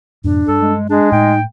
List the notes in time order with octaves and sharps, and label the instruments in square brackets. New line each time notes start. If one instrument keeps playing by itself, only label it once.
[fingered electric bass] F2 G#2 B2 [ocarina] D4
[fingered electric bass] G2 [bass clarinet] A4
[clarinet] G#3
[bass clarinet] G#3 [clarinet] D4 [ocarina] G#4
[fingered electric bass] A2 [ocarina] D#4 [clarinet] G5